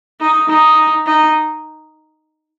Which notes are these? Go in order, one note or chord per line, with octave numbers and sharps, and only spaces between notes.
D#4
D#4
D#4